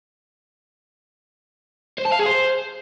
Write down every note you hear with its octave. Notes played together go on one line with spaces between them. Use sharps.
C5
A5
F5
G#4
C5